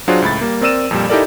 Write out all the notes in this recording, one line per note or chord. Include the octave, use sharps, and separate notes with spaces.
F#3 D4 F4 F#4 G#4 C5
C#2 A2 B5 A6
G3 A#3
C4 A#4 D5 E6 D#7 E7
F2 A#2 G3
D#4 E4 G4 A4 A#4 D5